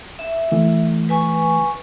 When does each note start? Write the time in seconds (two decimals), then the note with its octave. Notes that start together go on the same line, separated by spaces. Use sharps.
0.19 E5
0.52 E3 A3
1.09 B4 G#5 C#6